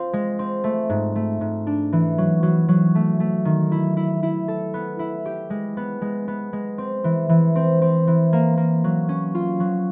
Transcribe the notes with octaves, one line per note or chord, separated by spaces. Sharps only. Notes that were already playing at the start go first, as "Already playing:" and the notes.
Already playing: C4 F4
G#3
C4
A3
G#2
A3
G#2
D4
E3
F#3
F#3
F#3
A3
A3
D#3
E4
E4
E4
A4
B3
E4
G4
G#3
B3
G#3
B3
G#3
C4
E3
E3
C4
C4
E3
A#3
A#3
F#3
C#4
F4
F#3